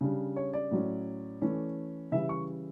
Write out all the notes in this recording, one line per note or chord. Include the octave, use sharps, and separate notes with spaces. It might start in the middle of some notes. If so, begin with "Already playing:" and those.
C#3 G3 D4
C#5
D5
A2 F#3 C#4
E3 A3 C#4
C#3 E3 G3 E5
C#6